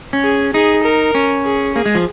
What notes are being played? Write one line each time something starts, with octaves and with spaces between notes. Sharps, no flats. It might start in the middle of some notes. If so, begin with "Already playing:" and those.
C#4
G#4
D#4 G#4
A#4
C#4
G#4
A#3 G#4
G#3
F3